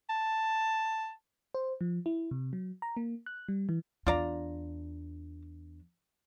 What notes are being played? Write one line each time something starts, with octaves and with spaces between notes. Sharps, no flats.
A5
C5
F3
E4
C3
F#3
A#5
A#3
F#6
G3
E3
E2 D4 F4 D5 A#5